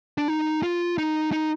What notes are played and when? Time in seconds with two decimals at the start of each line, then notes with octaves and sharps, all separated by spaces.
0.18 D4
0.28 D#4
0.63 F4
0.98 D#4
1.32 D#4